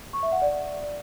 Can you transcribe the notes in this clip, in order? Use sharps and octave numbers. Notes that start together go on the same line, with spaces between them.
C#6
E5
F#5
D5